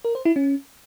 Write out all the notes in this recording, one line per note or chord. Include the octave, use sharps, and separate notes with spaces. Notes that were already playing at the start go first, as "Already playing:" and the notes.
A#4
C5
E4
C#4